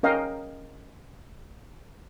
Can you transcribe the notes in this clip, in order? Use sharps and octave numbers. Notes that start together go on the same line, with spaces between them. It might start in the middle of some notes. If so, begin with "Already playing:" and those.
C#4 A#4 D#5 F5 G5